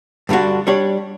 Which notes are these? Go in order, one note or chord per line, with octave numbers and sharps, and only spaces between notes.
G2 D3 G3 D4 F#4
G3 D4 G4 C#5